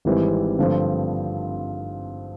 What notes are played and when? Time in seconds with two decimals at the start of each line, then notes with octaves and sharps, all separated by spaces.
0.05 G#1 G#2 E3 G3 C4
0.59 G2 D3 F3 A3 C4